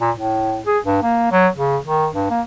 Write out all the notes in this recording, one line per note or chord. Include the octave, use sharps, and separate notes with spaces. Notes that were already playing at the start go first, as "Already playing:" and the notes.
A#2
A2
G#4
G2
A#3
F#3
C#3
D#3
G2
A#3